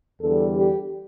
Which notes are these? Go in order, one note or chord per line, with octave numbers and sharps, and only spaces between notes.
E2 D3 G3 A4
G4